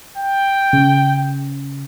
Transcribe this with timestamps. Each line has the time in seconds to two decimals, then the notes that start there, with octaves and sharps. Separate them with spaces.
0.17 G5
0.73 C#3